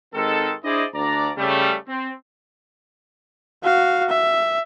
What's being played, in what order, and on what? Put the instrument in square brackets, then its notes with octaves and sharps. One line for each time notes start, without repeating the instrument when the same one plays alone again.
[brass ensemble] G#1 D#3 G#3 D#4 A4
D4 E4 G#4 C5 D5 D#5
D2 D4 D5 A#5
C#3 G3 A3
C4
[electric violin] F#4 F5
E5